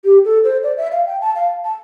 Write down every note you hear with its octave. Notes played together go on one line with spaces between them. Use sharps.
G4
A4
C5
D5
E5
F5
G5
A5
F5
A5